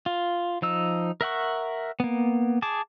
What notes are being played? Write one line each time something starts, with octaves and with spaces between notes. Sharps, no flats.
F4
F3 D#4 E6
A#4 E5 F#5 C#6
A#3 B3
G#4 A5 D6